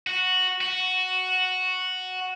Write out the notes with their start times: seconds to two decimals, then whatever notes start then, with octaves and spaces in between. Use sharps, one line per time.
0.07 F#4
0.61 F#4